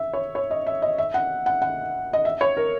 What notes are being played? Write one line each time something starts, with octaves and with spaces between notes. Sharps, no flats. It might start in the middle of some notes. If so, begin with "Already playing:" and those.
Already playing: E5
C#5
C#5
D#5
E5
D#5
E5
F#5
F#5
F#5
D#5
E5
C#5
A#4